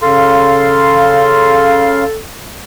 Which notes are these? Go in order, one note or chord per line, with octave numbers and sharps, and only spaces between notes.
C#3 A4 F5 C6